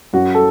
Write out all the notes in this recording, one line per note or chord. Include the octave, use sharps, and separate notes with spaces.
F#2 F#4
A4